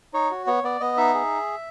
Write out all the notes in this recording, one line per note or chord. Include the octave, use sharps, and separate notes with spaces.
D#4 C#5
F#4
B3 C#5
B3 D5
B3 D#5
D#4 E5
G#4